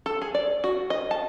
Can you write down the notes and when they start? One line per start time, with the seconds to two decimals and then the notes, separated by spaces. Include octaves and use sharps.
0.06 A4
0.22 G#4
0.35 D5
0.64 F#4
0.90 D#5
1.11 A5